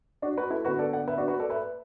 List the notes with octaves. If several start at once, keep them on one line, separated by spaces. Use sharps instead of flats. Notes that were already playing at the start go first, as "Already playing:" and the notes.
D4 F#4
F#4 B4
E4 A4
D3 B3 F#4 B4
A4 D5
D5 F#5
B4 E5
D4 F#4
F#4 B4
A4 D5
B4 E5